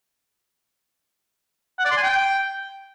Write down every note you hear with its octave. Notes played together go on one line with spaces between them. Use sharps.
F#5
D5
C6
G#5
G5